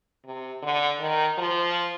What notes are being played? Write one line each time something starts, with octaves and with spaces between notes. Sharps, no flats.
C3
D3
D#3
F3